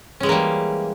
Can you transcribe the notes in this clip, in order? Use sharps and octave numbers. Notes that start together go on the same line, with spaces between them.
E3 G3 G#3 A#3 C#4